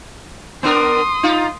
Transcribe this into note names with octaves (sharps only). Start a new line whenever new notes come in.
B3 D4 A#4 C6 D#6
D#4 F4